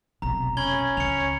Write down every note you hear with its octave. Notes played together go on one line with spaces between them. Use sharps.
F1 B1 A#5
C#4 B5 G#6 G7
C#2 C#3 C#7 F7